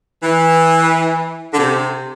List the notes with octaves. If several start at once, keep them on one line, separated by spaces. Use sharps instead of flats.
E3
D3
C3